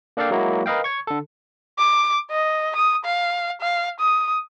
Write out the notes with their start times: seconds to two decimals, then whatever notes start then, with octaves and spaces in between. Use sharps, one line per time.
0.17 A#3 D4 A4 D5 F5 G5
0.31 F#3 G#3 A#3 E4 F#4
0.66 A#4 B4 D#5 F5 G5
0.84 C#6 G#6
1.07 D3 A4
1.78 D6
2.31 D#5
2.76 D#6
3.05 F5
3.61 F5
4.00 D#6